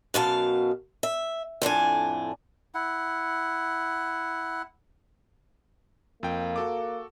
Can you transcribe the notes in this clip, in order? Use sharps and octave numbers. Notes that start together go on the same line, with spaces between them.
F#2 B2 F5 A5
E5
F2 A2 D4 G#5
E4 F#5
F2 A#3 G5
F#4 A4 D6